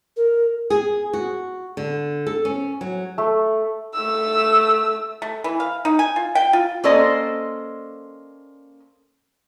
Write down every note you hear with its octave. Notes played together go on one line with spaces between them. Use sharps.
A#4
G#4
F#4
D3
A4
C#4
F#3
A3
A3 E6
A3
E3
F5
D#4
G#5
F4
G5
F4
A#3 C#4 A4 C5 D5 D#5